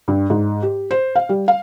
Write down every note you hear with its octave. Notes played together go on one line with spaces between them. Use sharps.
G2
G#2
G4
C5
F5
G3
F5